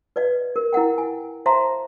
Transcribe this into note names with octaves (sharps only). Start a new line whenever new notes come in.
B4 D5 D#5 F5
A#4
E4 A#4 F#5 G5
G#5
C5 E5 F5 A5 A#5 C6